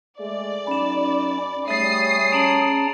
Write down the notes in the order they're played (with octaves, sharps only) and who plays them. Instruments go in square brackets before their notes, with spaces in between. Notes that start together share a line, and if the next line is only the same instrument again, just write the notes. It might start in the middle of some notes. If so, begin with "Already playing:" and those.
[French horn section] G#3 A3 G#4 [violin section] D5
[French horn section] F#2 D#4 [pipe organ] C#4 [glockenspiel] B5 E7
[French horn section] G3 G#4 C#5 [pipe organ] A3 [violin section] D#6 C7 [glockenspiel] A6 D#7
[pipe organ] C#4 A5 A#5 [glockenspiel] D7 E7 F#7